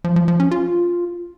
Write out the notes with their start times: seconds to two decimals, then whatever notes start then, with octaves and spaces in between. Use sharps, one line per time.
0.04 F3
0.16 F3
0.28 F3
0.40 C#4
0.51 F4